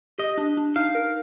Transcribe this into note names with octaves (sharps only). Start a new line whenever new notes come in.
G4 D#5
D4
D4
D#4 F5
A#4